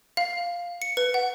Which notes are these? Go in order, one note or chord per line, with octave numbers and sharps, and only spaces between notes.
F5
C#7
B4
F#5